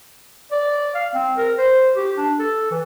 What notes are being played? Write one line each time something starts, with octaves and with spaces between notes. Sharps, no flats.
D5
F5
C4
A#4
C5
G4
D4
A4
E3